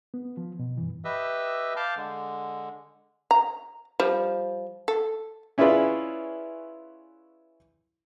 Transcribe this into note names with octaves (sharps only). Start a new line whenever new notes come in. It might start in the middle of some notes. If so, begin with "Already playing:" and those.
B3
F3
B2
G2 E3
G4 B4 D#5 E5 E6
F5 A5 D6 F6 G6
D3 G#3
A#5
F3 G3
A4
C#4 E4 F4 G#4 B4 D5